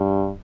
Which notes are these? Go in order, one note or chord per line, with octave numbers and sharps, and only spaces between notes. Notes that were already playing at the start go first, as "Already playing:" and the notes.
Already playing: G2